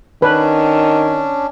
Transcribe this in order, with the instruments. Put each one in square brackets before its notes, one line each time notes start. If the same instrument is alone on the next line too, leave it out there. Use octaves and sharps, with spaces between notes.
[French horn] D#3 [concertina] C#4 D4 [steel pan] B4